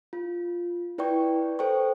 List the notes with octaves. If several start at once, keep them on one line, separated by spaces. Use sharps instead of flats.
F4
E4 B4 D5 G5 C#6
A4 C5 G5 C#6